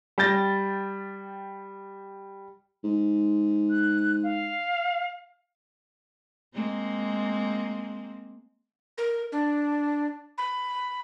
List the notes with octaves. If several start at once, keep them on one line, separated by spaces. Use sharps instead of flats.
G3 G5 G6 A6 A#6
G#2
F#6
F5
G#3 A#3 C4
A#4
D4
B5